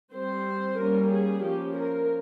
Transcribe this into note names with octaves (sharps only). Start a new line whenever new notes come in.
G3 C4 C5
G3 A#3 C#4 A#4
G#4
F3 A#3 C#4 G4
A#4